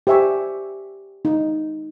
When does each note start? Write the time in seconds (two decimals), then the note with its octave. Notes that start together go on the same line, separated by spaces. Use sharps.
0.07 G4 C5 E5 G#5 C#6
1.25 D#4